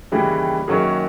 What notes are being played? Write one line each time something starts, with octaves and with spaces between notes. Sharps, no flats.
D#2 C#3 E3 G3
F#2 D#3 F#3 A#3 C#4 G#4